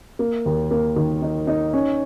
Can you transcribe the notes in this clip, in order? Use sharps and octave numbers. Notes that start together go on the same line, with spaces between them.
A#3
D#2
A#3
D#3
D#4
D#4
C#4